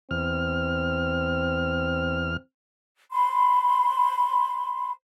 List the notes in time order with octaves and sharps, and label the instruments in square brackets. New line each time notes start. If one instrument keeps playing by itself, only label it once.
[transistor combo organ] E2 F6 [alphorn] C4
[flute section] B5 C6